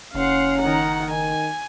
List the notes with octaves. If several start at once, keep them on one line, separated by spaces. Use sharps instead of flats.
F#1 C#4 F5 F#5 C6
D#3 F#5 A#5
D#3 G#5